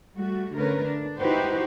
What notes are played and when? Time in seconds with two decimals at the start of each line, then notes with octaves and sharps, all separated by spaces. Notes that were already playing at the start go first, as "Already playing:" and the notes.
0.15 G3 A3 F#4
0.55 D3 A3 C#4 A#4 B4
0.85 D4
1.20 D#4 E4 F#4 G4 B4 C5